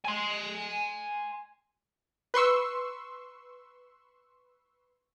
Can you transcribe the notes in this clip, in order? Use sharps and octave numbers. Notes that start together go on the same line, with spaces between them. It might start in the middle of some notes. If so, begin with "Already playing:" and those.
G#5 C6
B4 C6 C#6 E6